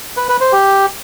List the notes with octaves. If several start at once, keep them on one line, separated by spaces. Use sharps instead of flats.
B4
B4
C5
G4